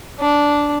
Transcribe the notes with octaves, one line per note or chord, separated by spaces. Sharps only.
D4